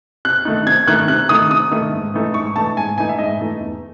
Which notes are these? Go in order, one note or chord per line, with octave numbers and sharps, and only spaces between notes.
C3 F#6
D#3 A3 D#4
C3 G#6
D#3 A3 D#4 F#6
C3 F#6
D#3 A3 D#4 D#6
C3 D#6
D#3 A3 D#4
G#2
E3 A3 D#4
G#2 C#6
E3 A3 D#4 A5
G#2 G#5
E3 A3 D#4 G#5
E5
G#2 D#5
E3 A3 D#4
E2